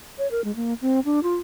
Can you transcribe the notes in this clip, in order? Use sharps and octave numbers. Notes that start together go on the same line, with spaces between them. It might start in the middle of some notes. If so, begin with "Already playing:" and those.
C#5
A#4
G#3
A#3
C4
D4
F4